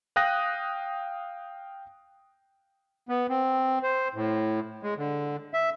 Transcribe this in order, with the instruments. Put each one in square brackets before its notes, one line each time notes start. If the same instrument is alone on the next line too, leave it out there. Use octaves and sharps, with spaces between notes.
[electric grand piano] F5 G5 D#6 F#6 A#6
[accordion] B3
C4
C5
A2
G#3
D3
E5